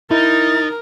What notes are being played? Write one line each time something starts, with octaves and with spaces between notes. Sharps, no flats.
D#4 E4 A#4 A6